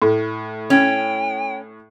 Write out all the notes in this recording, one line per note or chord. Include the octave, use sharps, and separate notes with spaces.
A2
C#4 G5